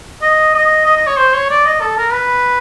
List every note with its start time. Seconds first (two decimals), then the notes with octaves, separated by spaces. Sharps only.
0.22 D#5
0.54 D#5
0.86 D#5
0.97 D#5
1.07 C#5
1.17 C5
1.34 C#5
1.50 D5
1.65 D#5
1.81 A4
1.97 A#4
2.13 B4